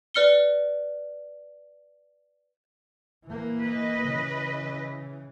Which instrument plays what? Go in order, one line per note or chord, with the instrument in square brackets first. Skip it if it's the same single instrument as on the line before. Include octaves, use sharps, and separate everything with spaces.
[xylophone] B4 D5 F6 C#7 G7
[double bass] E3 A#3
[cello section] B4 D#5
[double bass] C#3 E3